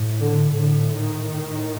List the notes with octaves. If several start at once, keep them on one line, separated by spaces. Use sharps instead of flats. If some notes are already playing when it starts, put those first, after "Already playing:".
Already playing: A2
D3
A2 D3
D#3
A2